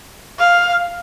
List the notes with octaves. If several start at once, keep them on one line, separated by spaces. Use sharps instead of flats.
F5